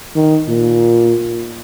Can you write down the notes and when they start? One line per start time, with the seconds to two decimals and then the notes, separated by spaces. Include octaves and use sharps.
0.16 D#3
0.48 A#2